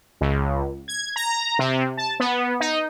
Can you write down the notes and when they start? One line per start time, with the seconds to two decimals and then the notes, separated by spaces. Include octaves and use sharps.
0.21 C#2
0.88 G#6
1.16 A#5
1.59 C3
1.97 A5
2.20 B3
2.60 D#4